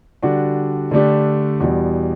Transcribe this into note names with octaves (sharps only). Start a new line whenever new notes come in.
D3 G3 D4 F#4
D3 A3 D4 G4
E2 B2 G3